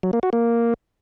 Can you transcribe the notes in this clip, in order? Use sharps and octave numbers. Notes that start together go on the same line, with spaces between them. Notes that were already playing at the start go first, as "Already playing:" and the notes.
F#3
A#3
F#4
A#3